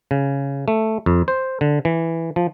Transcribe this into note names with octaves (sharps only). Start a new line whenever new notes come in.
C#3
A3
F2
C5
D3
E3
F3